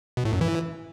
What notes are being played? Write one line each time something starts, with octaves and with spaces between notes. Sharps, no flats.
B2
A2
F#2
E3